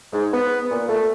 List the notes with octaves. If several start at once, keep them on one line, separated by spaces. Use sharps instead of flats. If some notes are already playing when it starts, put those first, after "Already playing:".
G#2
B3
A#2
A3